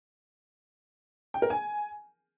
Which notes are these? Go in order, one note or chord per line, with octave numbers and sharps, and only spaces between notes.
G5
A#4
G#5